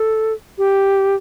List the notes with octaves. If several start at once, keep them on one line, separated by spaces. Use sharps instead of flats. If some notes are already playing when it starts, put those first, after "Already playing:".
Already playing: A4
G4